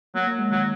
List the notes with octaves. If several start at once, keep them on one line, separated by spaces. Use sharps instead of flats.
F#3 A#3
A#3
G#3
D#3 F#3